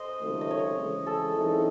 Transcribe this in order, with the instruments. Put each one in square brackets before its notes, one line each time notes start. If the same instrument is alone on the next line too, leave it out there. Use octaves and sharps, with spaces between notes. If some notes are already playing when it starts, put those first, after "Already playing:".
Already playing: [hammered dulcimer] C5 D#5
[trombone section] C#2 C3 D#3 F#3 A3
[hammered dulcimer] D#5
C#5
[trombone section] C#3 E3 G#3
[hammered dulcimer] A4
[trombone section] F#2 E3 C4 D#4 G#4